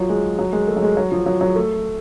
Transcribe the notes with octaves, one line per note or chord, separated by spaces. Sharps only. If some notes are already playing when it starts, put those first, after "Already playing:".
Already playing: F3 F#3
G#3
F#3
G#3
A3
F#3
G#3
F#3
F3
F#3
F#3
A3